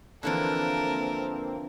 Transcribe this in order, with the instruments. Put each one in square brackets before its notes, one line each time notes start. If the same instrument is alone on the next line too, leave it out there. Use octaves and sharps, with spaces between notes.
[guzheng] D3 E3 F3 [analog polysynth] A#3 C4 [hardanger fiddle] A4 A#4